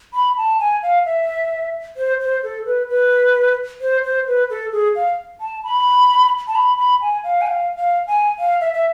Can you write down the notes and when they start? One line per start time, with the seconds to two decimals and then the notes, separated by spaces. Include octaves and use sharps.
0.14 B5
0.37 A5
0.60 G#5
0.83 F5
1.06 E5
1.97 C5
2.20 C5
2.43 A4
2.66 B4
2.89 B4
3.81 C5
4.03 C5
4.27 B4
4.50 A4
4.72 G#4
4.96 F5
5.41 A5
5.64 B5
6.47 A5
6.55 B5
6.77 B5
7.01 G#5
7.24 F5
7.41 G#5
7.46 F5
7.77 F5
8.07 G#5
8.39 F5
8.61 E5
8.74 E5